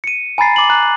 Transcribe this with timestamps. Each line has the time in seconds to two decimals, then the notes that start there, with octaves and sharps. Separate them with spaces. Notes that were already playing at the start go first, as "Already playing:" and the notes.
0.04 C#7 D#7
0.38 G#5 A#5 B5 A6 C7
0.56 D6 F#7
0.70 A#5 F#6